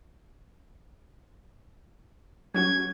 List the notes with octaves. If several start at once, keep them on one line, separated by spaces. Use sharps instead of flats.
F#3 C#4 F#4 G#6